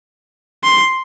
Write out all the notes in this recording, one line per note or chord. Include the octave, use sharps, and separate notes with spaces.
C6